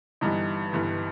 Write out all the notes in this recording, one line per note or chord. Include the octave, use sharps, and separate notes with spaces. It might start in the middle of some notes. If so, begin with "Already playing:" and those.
G1 G2 E3 G3 D#4
G1 G2 E3 G3